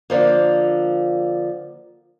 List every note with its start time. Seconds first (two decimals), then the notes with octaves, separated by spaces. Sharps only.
0.10 D3 F3 A#3